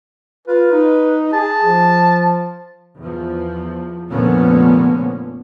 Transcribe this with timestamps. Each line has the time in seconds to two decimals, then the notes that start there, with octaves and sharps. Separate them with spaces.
0.48 F4 B4
0.72 D#4
1.33 G#4 A5
1.64 F3
3.00 E2 F3
4.09 F1 A#2 D3 F3 B3 C#4